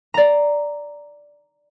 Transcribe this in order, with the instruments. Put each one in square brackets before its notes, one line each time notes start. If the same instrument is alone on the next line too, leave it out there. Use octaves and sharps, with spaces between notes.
[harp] D5 A#5